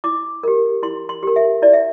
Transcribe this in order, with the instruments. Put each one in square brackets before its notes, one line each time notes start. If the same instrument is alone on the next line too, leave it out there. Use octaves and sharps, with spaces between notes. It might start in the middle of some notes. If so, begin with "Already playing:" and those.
[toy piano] E4 D6
G4 A#4
E4 C6
C6
G4 A#4
E5
E4 D5
E5